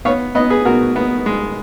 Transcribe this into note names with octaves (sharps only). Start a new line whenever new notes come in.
B3 C#5 F5
B3 B4 D#5
G#4 B4
B2 F#4 A#4
B3
G#3